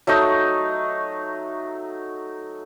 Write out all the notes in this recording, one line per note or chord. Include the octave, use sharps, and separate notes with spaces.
F#3 A3 D#4 D#5